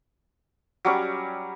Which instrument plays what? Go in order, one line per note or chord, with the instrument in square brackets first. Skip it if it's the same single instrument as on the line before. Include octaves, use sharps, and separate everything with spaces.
[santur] F#3 G3 C#4 D6